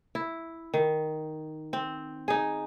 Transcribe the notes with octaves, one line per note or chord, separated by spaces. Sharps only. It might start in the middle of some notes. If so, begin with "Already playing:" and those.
E4
D#3
C4
D#4 G#4